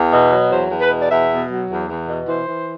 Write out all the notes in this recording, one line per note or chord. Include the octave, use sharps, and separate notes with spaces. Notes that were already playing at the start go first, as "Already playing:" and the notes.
Already playing: E2
B2
F#3
E2 C5
E2
B4
B2
D5
E2 E5
B2
F#3
E2
E2
B2
E3 C5
E3